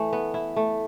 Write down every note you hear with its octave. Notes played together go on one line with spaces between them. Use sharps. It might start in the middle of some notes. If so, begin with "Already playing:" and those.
Already playing: E3 A3
B3
E4
A3